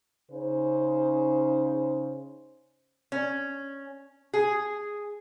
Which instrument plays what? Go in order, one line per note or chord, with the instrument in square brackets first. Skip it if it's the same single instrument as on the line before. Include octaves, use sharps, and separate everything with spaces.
[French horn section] C#3 C#4 D#4 C5
[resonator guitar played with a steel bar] C#4
G#4